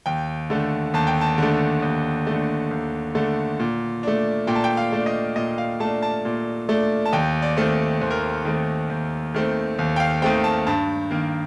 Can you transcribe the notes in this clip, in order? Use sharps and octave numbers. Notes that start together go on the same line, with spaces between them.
D#2 G5
D3 A3
D#2 A5
G5
A5
D3 A3
D#2
D3 A3
D#2
D3 A3
A#2
A3 D4
A#2 G5
A5
G5
F5
A3 D4
D#5
A#2 D#5
F5
A3 D4 A5
A5
A#2
A3 D4
A5
D#2 G5
D5
D#3 A3 C4
D#2 C5
A#4
C5
D#3 A3 C4
D#2
D#3 A3 C4
D#2
G5
F5
D#3 A3 C4 G5
A5
G2 A5
D#3 A#3